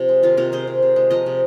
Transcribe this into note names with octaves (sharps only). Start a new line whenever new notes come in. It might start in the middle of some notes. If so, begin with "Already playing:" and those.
Already playing: C3 F3 C5
G#3
D#3 F4 A#4
C3 F4 A#4
C3 G#4 C5
C3
C3
G#3
F3 A#4 D#5
C3